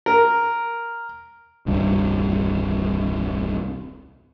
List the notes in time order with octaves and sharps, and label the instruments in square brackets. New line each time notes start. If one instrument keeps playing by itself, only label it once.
[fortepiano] A#4
[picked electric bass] D#1 C2 G2 C3